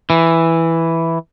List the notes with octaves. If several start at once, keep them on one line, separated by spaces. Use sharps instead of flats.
E3